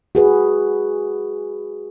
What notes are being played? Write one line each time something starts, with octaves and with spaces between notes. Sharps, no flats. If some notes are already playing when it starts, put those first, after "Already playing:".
F#4 G#4 B4